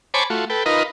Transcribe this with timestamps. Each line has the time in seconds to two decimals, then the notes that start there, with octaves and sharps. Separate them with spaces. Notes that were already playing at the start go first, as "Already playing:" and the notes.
0.14 C5 C#5 G#5 A5 B5 D6
0.30 A3 F4 F#4
0.50 A4 B4 G5
0.66 D#4 F4 A#4 B4 D#5